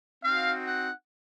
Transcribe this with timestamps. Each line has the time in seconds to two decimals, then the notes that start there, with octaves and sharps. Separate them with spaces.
0.23 C4 D#4 F#4 F5
0.66 F#5